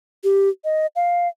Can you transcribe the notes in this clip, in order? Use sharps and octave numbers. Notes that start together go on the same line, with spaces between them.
G4
D#5
F5